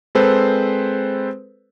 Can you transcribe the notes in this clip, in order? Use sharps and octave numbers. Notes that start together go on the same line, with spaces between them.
G#3 C4 A4 B4 C5